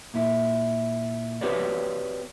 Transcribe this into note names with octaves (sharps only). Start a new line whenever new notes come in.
A#2 E4
C4 F#4 G4 B4 C#5 D5